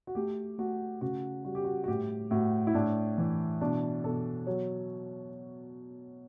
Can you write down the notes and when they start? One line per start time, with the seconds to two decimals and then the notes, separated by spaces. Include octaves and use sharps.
0.07 F#4
0.15 A3 G4
0.58 A3 F#4
1.01 C#3 F#4
1.45 G3 F#4
1.55 G4
1.65 F#4
1.84 F#4
1.88 A2 G4
2.31 A2 F#4
2.67 E4
2.74 A2 D4
3.18 E3
3.61 B2 D4
4.04 B2 A4
4.46 F#3 C#5